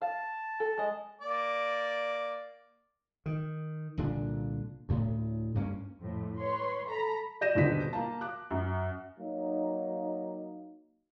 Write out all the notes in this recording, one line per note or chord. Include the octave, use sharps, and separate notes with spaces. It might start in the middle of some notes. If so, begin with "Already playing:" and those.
F5 A5
A4
G#3 D#5
A#3 D5 D6
D#3
C2 A#2 D3 D4
D2 A2
D2 G2 A#3 C#4
F2 A2
B4 C#5 C6
A4 A#5 B5
D5 G6 A#6 D#7 E7
D#1 B2 D3 B6
A#3 A5
D6 F#6
F#2
F#3 A#3 D#4